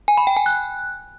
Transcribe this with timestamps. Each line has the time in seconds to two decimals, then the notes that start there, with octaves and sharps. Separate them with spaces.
0.08 G#5
0.17 B5
0.27 G5
0.37 G#5
0.46 F#6